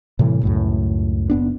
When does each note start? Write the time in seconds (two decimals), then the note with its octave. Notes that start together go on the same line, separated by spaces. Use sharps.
0.19 A2 C3 E3 G3
0.43 C#2 F#2 A2
1.30 F#1 B3 D4